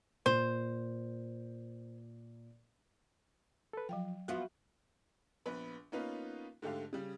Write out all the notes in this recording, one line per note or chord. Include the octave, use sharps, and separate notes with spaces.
A#2 C5
A4 B4
F3 F#3 F5 G5
F3 B3 F4 F#4 E5 F#5
A#1 B3 B4 B5
A#3 B3 C#4 D#4 F4 B4
G#2 D3 A3 G4 F5
C#3 G3